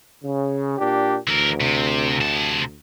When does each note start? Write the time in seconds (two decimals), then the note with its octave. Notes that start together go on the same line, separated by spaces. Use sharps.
0.23 C#3
0.78 A#2 D4 G4
1.28 D2 E3 A#4
1.61 C3
2.20 C3 A5